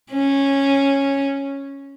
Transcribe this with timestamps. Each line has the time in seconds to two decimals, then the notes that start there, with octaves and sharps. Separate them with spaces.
0.12 C#4